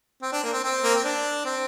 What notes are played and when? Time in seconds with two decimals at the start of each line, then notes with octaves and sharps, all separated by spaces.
0.22 C4
0.32 D4
0.43 A#3
0.53 C4
0.64 C4
0.84 A#3
0.94 C4
1.04 D4
1.45 C4